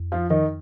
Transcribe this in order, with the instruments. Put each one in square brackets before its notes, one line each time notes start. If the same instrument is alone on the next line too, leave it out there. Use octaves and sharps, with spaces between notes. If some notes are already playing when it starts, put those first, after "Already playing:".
Already playing: [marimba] F2
[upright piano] F3 F4
D#3 D#4